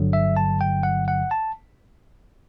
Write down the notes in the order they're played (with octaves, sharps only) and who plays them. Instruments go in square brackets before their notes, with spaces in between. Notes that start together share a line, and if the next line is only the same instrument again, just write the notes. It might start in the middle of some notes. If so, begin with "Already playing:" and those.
Already playing: [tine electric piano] G1 G2 D3 F#3
E5
A5
G5
F#5
F#5
A5